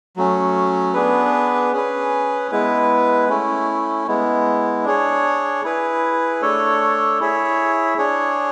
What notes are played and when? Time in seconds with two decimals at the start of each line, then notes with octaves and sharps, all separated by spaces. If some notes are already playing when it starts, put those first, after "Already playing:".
0.16 F#3 A3 C#4
0.94 B3 D4 G#4 B4
1.73 C#4 G#4 B4
2.51 G#3 B3 E4 B4
3.29 A3 C#4 E4
4.08 G#3 B3 E4
4.85 D4 G#4 C#5
5.64 E4 G#4 B4
6.42 A3 D4 A4 C#5
7.20 E4 G#4 C#5 E5
7.98 D4 G#4 C#5